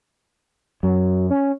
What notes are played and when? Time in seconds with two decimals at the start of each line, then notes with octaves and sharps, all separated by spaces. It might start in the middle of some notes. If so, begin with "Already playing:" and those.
0.83 F#2 F#3
1.30 C#4